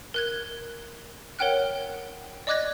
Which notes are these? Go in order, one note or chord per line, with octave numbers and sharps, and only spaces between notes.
A#4 F#6 G#6
A#4 C#5 F#5 G5 F6 F#6
D5 D#5 D6 F#6 G#6 A#6